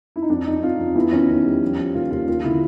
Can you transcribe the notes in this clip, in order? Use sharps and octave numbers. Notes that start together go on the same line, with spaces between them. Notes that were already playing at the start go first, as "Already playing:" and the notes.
E4
D#4
F2 D4
F2 D#4
F2 F4
F2
E2 E4
D#3 C#4
D#3
G3
F3
F3
D#2 F4
D#2 F4
D#2 F4
D3 E4